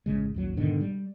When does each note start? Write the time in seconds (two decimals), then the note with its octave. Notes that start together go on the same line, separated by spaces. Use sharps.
0.06 A1 C#3 G#3
0.34 A1 D#2 F#3
0.57 G#2 B2 D3 D#3
0.81 G3